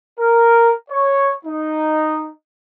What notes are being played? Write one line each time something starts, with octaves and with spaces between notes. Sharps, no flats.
A#4
C#5
D#4